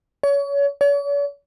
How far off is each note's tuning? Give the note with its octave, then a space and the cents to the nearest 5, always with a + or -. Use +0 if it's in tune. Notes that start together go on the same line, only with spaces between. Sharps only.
C#5 +30
C#5 +45